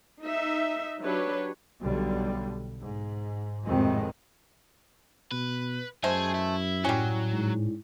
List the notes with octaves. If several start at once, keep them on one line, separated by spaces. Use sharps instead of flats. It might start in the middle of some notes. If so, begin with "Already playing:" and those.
D#4 E5
F#3 D4 G4 B4 C#5
B1 D3 G3
G#2
G#1 F2 A2 C3 D#3 G#3
B2 B4
F#2 G#3 A3 G#4 C5
E4
A2 F#3 G3 C#4
G#2